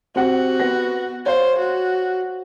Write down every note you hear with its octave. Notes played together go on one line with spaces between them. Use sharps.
C4 F#4 G4 F#5
B3 F#5 A#6
C5 C#5 F5
F#4